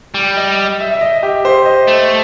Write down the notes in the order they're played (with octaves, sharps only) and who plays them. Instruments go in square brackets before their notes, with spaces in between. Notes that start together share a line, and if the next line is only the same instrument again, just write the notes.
[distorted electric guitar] G3
[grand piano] D#5
E5
E5
D#5
G4
C5
D#5
[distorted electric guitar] A3